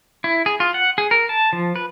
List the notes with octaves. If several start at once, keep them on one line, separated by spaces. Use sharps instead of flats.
E4
G#4
F4
F#5
G#4
A#4
A5
F3
B4